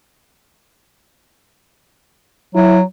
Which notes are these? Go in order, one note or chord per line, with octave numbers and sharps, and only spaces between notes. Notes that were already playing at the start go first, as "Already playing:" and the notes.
F#3 E4